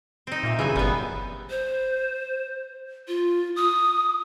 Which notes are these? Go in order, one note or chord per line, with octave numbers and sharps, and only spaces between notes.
C4 D#4
A#2 D#5 E5
D#1 F#2 C#3 E3 G#4 G#5
G1 G3 B3
C5
F4
D#6